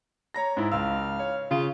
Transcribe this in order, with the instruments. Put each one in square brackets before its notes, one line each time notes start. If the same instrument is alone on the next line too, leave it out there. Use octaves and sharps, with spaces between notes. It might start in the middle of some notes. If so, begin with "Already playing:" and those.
[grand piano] C#5 A#5 A#6
G#2 E4
[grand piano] C#2 E6 [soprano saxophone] F5
[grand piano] C#5
[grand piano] C#3 [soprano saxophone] F4